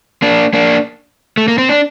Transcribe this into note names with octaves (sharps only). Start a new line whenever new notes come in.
A#3 D4
A#3 D4
A3
A#3
C4
D4